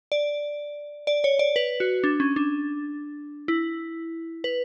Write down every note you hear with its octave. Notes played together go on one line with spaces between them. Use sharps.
D5
D5
C#5
D5
B4
F#4
D4
C#4
D4
E4
B4